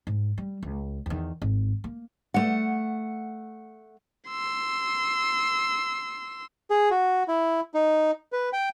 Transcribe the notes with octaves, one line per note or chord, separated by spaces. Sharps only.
G#2
G3
C#2
E2 D#3
G#1
A#3
A3 F#5
C6 E6
G#4
F#4
E4
D#4
B4
G5